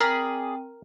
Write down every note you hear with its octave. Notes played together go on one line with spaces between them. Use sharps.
C4 G#4 A#4 D5 G5 B5